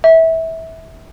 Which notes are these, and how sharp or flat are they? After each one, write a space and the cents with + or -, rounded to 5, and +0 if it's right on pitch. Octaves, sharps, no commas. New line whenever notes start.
E5 -20